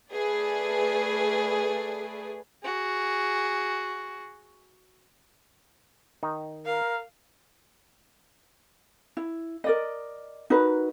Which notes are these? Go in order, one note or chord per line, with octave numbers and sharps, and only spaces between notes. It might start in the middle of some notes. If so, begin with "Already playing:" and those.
A3 G#4 B4 D5
F#4 G#4
D#3 D#4
A#4 F5
E4
A#4 D5 D#5
D#4 F#4 A#4 B4